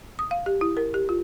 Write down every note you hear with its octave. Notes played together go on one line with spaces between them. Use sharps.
D#6
F5
G4
E4
A#4
G4
F4